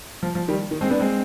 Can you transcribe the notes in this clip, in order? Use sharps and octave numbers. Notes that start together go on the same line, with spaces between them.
F3
F3
D#3 G3
D#3
G#3 C4
B3 D4
G#3 C4